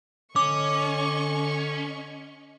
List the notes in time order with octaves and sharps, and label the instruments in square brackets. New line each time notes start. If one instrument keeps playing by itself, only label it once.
[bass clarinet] D3 [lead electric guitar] C#4 [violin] D#5 C#6 [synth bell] D6